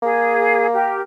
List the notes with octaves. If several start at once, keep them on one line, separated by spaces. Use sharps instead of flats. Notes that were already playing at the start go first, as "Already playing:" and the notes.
A#3 G#4
G4 A#4